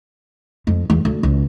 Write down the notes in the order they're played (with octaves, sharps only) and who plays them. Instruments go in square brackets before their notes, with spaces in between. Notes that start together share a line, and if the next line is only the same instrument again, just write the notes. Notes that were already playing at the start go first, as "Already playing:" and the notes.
[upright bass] F2
E2
D2
C#2